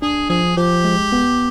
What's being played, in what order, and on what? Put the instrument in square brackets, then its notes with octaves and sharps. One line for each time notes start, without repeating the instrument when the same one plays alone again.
[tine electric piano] D4 [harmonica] G#4
[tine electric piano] F3 [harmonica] G#4
[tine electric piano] F3 [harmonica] G4
[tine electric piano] G#3
B3